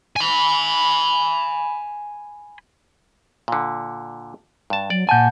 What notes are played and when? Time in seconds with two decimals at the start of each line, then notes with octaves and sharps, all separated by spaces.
0.16 G#5 B5
3.48 A#2 D3
4.70 G2 A5
4.90 F#3 D5
5.09 A#2 F#5 G#5 A5 G6